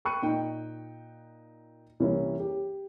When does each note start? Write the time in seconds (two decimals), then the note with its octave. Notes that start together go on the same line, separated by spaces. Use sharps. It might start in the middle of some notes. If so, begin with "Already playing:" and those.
0.05 G5 B5 C#6 F#6 C#7 D#7
0.22 A#2 D#4 G5
2.00 C2 E3 A#3 C#4 E4
2.40 G4